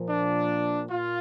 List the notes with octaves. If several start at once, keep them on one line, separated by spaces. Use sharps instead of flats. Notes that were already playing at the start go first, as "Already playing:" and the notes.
Already playing: A#2 F3
D4
A#2 F4